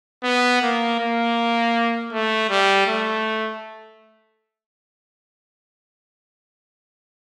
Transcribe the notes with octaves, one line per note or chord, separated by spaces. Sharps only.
B3
A#3
A#3
A3
G3
A3